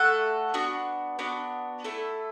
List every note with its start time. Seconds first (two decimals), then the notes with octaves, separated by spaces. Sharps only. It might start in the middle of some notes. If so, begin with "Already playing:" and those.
Already playing: A3 F#4 A4 F#5
0.54 B3 D4 F#4
1.19 B3 D4 F#4
1.84 A3 E4 A4